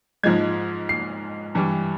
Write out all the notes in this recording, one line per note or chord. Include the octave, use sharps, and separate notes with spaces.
G#2 F3 G#3 G#6
C7
G2 E3 G3